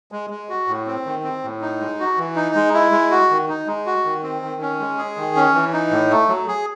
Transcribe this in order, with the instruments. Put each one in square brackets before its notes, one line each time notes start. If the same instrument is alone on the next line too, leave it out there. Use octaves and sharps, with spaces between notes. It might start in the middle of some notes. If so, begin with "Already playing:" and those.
[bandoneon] G#3
G#3
F#4
A2
C4
D#3
C4
A2
D#4
G#3
F#4
E3
D#4
G#3
E4
G#3
F#4
D#3
D#4
G#3
F#4
D#3
C4
D#3
C#4
G#3
G#4
D#3
C#4
E3
D#4
A2
A3
F#3
G#4